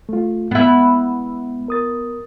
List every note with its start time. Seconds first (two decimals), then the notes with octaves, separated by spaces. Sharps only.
0.09 A3 F4
0.51 G#3 B3 E4
1.68 A#4 D#6 A6